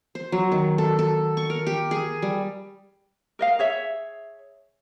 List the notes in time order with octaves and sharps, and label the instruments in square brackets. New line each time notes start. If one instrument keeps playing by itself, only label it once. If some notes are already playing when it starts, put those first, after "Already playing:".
[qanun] C5
F#3
D#3
A4
A4
C#6
A#4
G4
G#4
G3
[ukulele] A#4 D#5 F5
G#4 C#5 E5